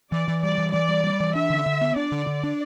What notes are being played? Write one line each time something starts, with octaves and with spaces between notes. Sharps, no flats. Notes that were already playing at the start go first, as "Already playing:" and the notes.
E3 D5
E3
G3 D5
E3
E3 D5
G3
G3
E3
D4 E5
D3
D3
B3
D4 D5
D3
D3
D4